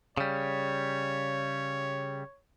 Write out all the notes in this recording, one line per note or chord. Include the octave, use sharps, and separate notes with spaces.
C#3 G3 C#5